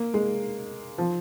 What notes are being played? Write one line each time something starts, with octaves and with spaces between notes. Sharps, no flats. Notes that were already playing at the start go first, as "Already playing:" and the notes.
Already playing: A#3
G#3
F3